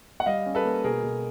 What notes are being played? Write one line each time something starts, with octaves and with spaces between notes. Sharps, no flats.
F#5
G3 D#5 F5
C#4
A4 B4
A#3
B2 G#4 A#4
B2